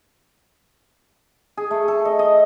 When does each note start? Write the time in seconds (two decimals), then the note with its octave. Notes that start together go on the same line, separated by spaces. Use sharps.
1.57 G#4
1.71 A3
1.88 A4
2.05 D#5
2.19 D#5